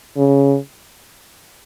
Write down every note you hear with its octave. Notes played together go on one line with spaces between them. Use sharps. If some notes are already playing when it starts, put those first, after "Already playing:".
C#3